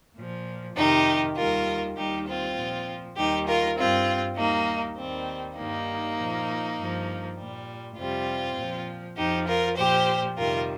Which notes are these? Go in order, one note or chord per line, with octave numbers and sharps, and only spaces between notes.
A#2 F3
F2 C3 D#3 D#4 G4
D#2 D#3 G3 F4 A#4
D#2 D#3 G3 D#4 G4
C4 F4
A#2 F3
D#2 D#3 G3 D#4 G4
F4 A#4
G2 G3 C4 F4
D#2 D#3 G3 A#3 D#4
D#2 D#3 G3 C4
G2 D#3 G3 A#3 D#4
A#2 F3
G2 F3
A#2 G3
F2 C3 G3 C4 F4
A#2 F3
F2 F3 D#4 G4
F4 A#4
A#2 F3 G4 C5
F2 C3 D#3 G3 F4 A#4